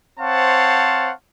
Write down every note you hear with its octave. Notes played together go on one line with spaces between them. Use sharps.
C4 C5 C#5 F5 F#5 A5